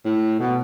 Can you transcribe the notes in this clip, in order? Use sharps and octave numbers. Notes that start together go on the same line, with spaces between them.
A2
B2